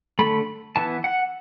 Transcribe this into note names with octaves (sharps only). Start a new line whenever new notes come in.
D3 A3 B5
E3 B3 A5
F#5